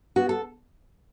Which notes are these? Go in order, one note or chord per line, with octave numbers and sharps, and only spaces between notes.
B3 F#4
A4